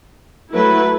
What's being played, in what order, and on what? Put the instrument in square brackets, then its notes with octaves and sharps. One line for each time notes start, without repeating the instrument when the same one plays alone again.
[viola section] F#3 A3 E4 B4